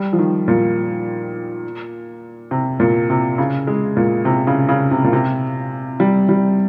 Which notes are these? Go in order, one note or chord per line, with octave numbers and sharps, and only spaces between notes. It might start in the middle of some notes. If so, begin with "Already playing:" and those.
Already playing: G3
F3
D#3
A#2
C3
A#2
C3
C#3
G#3
A#2
C3
C#3
C#3
C3
A#2
C3
G3
G3